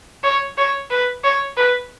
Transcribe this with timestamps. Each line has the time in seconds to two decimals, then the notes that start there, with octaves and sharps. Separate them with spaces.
0.24 C#5
0.58 C#5
0.91 B4
1.24 C#5
1.57 B4